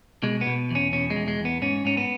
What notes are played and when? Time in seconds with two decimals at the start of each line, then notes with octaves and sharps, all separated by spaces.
0.23 B2 G#3
0.41 B3
0.47 B2
0.71 E2 C#4
0.93 B2 C#4
1.10 G#3
1.16 E2
1.28 G#3
1.39 E2
1.45 B3
1.62 G#2 C#4
1.85 G#2 C#4
1.97 B3